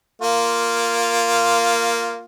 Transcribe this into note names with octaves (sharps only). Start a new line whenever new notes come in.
A#3 F4